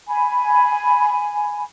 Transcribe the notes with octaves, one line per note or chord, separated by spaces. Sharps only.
G#5 B5